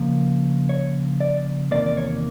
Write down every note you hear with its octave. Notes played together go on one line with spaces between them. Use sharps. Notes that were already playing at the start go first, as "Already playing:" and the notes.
Already playing: C#3 F3 A#3
C#5
D5
E2 C3 D#3 A#3 D5
D5
C#5